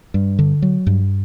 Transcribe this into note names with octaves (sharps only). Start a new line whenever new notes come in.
G2
D3
F#3
G2